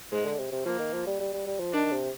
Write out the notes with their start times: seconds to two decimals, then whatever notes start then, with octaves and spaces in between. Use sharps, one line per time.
0.12 G#2 G#3
0.25 D3
0.38 C3
0.52 C3
0.65 F3 A#3
0.79 D#3
0.93 F3
1.07 G3
1.20 G3
1.33 G3
1.46 G3
1.59 F3
1.73 D#3 D4
1.92 C3